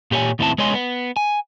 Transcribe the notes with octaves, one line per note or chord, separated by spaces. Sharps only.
A#2 G4 C5 C#5 G#5
D#2 A2 B3 C4 E4 A5
G#3 B3 C#5 D#5 G#5 C6
B3
G#5